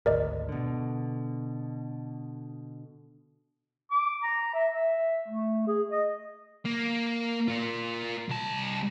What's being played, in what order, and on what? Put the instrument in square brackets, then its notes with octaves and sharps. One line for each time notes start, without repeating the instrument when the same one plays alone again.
[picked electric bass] G#1 D2 [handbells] A#4 D5 D#5
[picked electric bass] B2 D3
[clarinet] D6
A#5
E5
E5
A3
G#4
D#5
[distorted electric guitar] A#3
A#3 F4
C2 A5